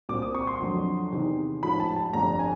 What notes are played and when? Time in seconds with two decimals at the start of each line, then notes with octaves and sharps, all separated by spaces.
0.09 C2 A#2 G3 C4 D6
0.22 D#6
0.35 C#6
0.47 C6
0.60 F2 D3 F#3
1.12 E2 C3 D#3
1.63 A1 G#2 F3 A3 B5
1.80 A5
1.96 A5
2.13 G1 F2 D3 G3 A#5
2.39 G#5